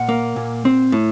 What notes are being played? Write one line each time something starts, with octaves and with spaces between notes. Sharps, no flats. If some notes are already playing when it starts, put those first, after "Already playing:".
Already playing: A#2 F#5
A#3
A#2
C4
A2